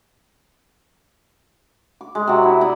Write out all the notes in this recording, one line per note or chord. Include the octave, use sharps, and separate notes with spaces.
D6
G#3
C3 F#3
E4
D#4 D5 D#5